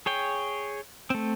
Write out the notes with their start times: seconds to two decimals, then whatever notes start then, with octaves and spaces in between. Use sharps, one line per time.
0.06 G#4 C#5 G5
1.10 A3 C4